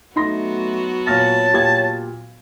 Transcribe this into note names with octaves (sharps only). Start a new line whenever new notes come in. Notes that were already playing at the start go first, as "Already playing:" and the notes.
F#3 A3 B3 D#4 F#4 C6 A#6
A#2 C#5 A5 F6 A#6
A#2 G4 G#6